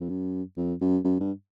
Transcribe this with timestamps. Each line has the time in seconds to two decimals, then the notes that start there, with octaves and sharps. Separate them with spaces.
0.01 F2
0.09 F#2
0.57 F2
0.81 F#2
1.04 F#2
1.20 G2